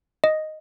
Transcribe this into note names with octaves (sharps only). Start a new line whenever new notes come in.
D#5